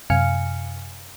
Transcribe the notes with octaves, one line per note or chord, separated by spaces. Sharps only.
F#2 C3 F5 G#5 F6 C#7